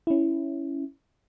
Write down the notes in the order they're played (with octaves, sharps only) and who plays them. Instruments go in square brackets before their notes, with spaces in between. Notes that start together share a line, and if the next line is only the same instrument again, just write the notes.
[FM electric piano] C#4 E4